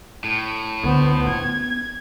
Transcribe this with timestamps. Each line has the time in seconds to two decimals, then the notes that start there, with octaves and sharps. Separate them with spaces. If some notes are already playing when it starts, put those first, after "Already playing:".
0.24 A2
0.84 D2 B3 C5
1.27 B3 F4 G#6